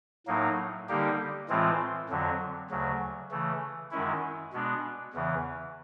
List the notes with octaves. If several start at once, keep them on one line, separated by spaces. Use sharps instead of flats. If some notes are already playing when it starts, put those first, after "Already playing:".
A2 F#3 A#3 D#4
D3 G3 A#3 D#4 G4
A2 E3 G#3 C4 F4
F2 D3 F#3
D2 C#3 F#3
C#3 E3 A3
F#2 D#3 G#3 C#4 E4
B2 G#3 B3 D4
E2 C#3 E3